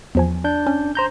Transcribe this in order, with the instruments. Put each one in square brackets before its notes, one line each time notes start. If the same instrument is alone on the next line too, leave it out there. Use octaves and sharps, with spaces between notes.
[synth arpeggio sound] E2 F3 G#5
[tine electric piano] D4 G6
[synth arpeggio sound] C#4
[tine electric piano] C5 A#5 G6